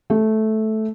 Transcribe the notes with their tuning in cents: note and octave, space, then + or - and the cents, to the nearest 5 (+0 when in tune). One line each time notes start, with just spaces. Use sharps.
A3 -10